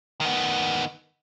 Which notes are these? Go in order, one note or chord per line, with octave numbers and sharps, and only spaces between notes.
D#3 B3